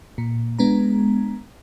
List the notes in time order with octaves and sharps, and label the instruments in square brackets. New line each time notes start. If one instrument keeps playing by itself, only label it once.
[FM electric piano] A#2
G#3 B3 D4 A#5